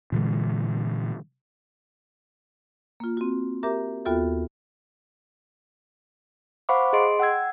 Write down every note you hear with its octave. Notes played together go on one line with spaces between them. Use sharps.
A#2 D3 E3 G#3
A#3 F4
C4 F#4
G4 A#4 E5 A#5 D6
D#2 B3 F4 F#4 A4 E5
C5 F5 F#5 B5 C#6 D6
G#4 D#5 C6 D7
F#5 G5 E6 G#6